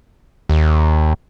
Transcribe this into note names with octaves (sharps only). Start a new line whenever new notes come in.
D#2